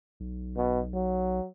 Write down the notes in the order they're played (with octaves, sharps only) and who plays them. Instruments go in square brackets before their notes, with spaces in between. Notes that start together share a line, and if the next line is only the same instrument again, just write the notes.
[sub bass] B1
[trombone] B2
F#3